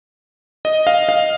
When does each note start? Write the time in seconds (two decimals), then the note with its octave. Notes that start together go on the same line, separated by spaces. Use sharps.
0.65 D#5
0.87 F5
1.09 F5